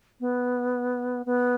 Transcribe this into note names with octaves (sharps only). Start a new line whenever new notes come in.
B3
B3